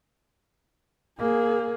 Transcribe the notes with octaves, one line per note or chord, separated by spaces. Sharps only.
A#3 G#4